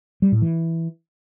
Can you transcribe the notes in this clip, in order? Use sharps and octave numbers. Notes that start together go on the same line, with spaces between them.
G3
A2
E3